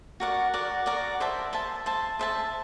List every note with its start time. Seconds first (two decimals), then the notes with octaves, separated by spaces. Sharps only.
0.20 F#4 A#4 D5 F#5
0.53 F#4 A#4 D5 F#5
0.86 F#4 A#4 D5 F#5
1.20 C5 E5 A5
1.53 C5 E5 A5
1.86 C5 E5 A5
2.19 C5 E5 A5